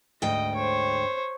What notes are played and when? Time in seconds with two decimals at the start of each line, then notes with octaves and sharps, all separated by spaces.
0.22 D2 G#2 D#5 G5
0.55 C5 C#5